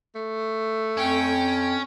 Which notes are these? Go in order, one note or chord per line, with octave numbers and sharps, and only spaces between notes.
A3
F2 C#4 G5